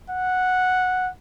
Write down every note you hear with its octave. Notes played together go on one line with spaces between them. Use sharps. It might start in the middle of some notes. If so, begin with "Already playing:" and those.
F#5